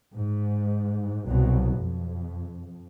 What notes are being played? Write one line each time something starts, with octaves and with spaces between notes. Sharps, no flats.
G#2
C2 B2 F#3
F2